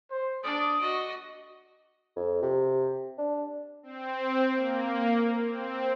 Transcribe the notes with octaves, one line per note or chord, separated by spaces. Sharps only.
C5
D4 D5 D#6
F#4 D#5
F2
C3
D4
C4
A#3
C4